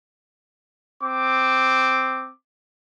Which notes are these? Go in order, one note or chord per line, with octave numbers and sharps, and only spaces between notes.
C4 D6